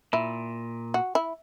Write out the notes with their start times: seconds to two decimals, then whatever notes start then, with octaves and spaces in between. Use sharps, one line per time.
0.13 A#2 E4
0.94 F#4
1.15 E4